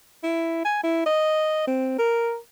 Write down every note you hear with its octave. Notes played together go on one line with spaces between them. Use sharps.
E4
G#5
E4
D#5
C4
A#4